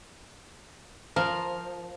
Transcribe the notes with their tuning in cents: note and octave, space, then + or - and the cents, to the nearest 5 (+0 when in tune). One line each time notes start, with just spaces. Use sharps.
F3 +0 A#4 +0